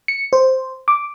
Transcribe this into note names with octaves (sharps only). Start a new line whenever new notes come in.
C#7
C5
D6